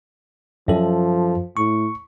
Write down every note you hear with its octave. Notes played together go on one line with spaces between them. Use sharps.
F#2 F3 A4
A2 C#6